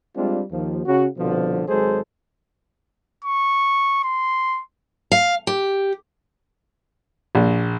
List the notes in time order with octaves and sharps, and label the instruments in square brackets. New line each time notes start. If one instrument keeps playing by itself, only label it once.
[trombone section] G3 G#3 C4 D4 F4
D#2 F3
C#3 F#4
C2 B2 D3 F3
G#1 F#3 G#3 G#4 A4 C5
[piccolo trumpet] C#6
C6
[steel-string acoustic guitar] F5
G4
[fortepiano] A#1